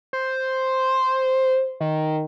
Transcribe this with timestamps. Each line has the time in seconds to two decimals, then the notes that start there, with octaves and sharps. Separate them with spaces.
0.13 C5
1.81 D#3